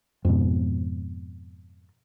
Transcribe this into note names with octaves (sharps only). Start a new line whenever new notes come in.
F2 G#2 B2